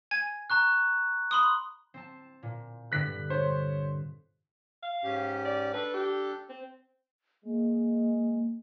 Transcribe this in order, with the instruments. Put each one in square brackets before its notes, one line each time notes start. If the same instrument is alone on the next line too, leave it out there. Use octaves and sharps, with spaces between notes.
[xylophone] G#5 G#6
[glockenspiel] A#5 C#6 F#6
[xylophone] B5 C6 D#6
[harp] C4 A5
A#2
[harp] G2 D3 [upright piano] F#6 B6
[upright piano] C5 C#5
[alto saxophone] F5
[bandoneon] G#2 C#4 G4
[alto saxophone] D5
[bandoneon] D4 A4 [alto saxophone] B4
[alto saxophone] G4
C4
[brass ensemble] G#3 [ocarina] A#3